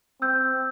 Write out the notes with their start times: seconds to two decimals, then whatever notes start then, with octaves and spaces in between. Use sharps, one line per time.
0.22 C4 E6 G6